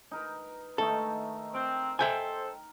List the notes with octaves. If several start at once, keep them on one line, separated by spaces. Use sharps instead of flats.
D#4 A#4 B4
D#3 A3 D#4 A4
C4 A#4
A4 C5 E5 G5 G#5